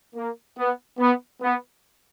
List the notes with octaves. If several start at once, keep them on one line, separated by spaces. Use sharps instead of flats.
A#3
B3
B3
B3